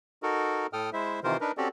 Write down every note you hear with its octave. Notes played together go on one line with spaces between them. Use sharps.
D#4 F#4 A4 A#4
A2 A4 G5 D#6 F6
G#3 E4 C5 E5
C3 D#3 E3 F4 A#4 C5
D4 D#4 A#4 B4
C4 C#4 F#4 G4 A4 D5